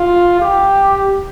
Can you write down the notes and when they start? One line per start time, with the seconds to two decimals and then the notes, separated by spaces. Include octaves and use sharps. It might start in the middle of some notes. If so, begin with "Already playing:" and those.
Already playing: F4
0.40 G4